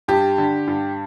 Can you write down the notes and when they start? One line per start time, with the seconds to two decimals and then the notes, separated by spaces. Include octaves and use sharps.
0.08 G2 G4
0.38 D3
0.67 G2